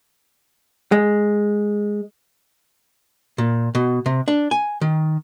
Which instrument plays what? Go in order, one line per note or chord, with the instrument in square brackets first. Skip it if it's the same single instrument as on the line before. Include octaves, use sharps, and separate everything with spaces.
[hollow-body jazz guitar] G#3
A#2
B2
C3
D4
G#5
D#3